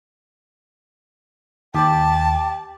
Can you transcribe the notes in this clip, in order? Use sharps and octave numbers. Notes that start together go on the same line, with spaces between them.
D#2 G4 D5 G5 A5